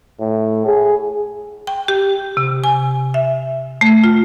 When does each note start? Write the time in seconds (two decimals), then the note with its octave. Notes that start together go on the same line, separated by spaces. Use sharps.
0.20 A2
0.66 G#4
1.67 G5
1.88 G4
2.37 C3
2.64 G#5
3.14 E5
3.81 A3
4.04 F4